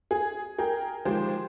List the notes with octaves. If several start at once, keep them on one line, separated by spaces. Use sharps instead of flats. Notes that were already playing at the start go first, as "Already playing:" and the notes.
G#4
G#4 A#4 G5
D#3 F3 G#3 G4 C5